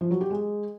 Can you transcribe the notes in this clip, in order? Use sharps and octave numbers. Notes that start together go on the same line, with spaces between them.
F3
F#3
G4
G#3